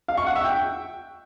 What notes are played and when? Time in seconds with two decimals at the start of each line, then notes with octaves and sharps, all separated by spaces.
0.08 F5
0.17 C#6
0.26 F#5
0.35 E5
0.44 G5